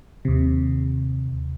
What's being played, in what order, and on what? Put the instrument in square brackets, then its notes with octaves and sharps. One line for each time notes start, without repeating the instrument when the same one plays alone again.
[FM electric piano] D#2 C3